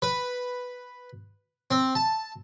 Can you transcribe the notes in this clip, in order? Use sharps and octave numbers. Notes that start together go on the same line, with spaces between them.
B4
C4
A5